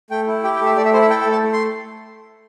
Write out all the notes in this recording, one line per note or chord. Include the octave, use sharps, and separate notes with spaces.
A3 G5
E4
G4 G5
G5
A3 E5
A3 D5
E5
E4 C5
E5
A4 G5
G5
A3
A5
A3
C6